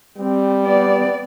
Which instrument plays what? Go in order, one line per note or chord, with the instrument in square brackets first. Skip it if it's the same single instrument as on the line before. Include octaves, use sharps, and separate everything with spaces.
[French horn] G3 [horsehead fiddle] C4
[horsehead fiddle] B3 D5